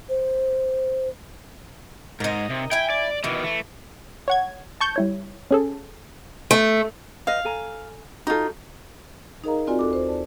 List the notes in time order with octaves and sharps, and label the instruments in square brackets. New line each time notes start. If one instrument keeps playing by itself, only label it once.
[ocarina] C5
[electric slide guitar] G#2 [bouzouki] D#4 A#4
[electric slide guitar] C3
[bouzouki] E4 G#5 [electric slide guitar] G5
[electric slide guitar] D5
[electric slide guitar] B2 D#3 [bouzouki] E3
[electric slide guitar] A3
[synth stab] C#5 F#5 G#6
A5 C#6 G6
G3 E4 C#5
C#4 G#4 A4
[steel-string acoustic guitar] A3
[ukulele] B4 D#5 [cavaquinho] F5
[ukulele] A4 G#5 A#5
[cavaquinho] D#4 F4 [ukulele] F#4 A4
[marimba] D#4 G#4 A#4 D#5 F5 A#5
C4 F4 F#4 G#4 D5 G#5
D#2 A4 D6
C5
D5 A5